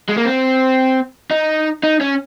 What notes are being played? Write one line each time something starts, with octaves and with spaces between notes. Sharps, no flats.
G#3
A#3
C4
D#4
D#4
C#4